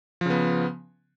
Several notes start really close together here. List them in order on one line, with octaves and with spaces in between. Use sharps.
F3 C#3 B3